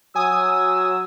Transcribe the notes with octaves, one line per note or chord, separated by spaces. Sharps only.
F#3 G#5 D#6 E6